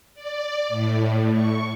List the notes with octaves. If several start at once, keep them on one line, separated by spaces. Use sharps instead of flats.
D5
A2
C#6